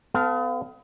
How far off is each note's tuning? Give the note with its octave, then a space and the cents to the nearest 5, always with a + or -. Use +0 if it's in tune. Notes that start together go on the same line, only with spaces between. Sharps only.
B3 +40 A4 +0 F5 +0